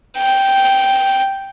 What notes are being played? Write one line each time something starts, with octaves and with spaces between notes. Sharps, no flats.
G5